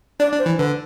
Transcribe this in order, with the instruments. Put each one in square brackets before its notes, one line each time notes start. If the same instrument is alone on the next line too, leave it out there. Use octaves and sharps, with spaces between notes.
[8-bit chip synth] D4 [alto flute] D5
[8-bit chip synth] D4
[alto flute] C5
[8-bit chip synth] E3
[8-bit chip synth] D3 [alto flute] B4